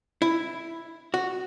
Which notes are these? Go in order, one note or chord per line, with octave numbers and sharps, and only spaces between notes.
E4
F#4